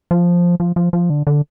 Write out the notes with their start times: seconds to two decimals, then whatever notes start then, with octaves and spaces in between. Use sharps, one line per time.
0.11 F3
0.60 F3
0.76 F3
0.93 F3
1.10 D3
1.27 D3